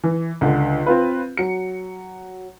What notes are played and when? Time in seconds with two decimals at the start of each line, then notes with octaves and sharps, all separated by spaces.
0.04 E3
0.41 C#2 D3
0.86 C4 F4 B4
1.37 F#3 C#7